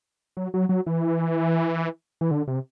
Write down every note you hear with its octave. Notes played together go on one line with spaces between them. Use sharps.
F#3
F#3
F#3
E3
E3
D3
C3